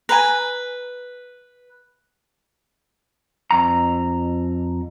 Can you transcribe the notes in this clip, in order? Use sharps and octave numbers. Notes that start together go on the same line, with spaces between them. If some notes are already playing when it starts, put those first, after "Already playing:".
B4 G#5 A#5
F2 A#5